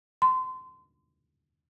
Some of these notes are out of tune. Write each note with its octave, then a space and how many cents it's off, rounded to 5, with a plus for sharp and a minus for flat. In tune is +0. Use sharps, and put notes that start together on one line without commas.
C6 -25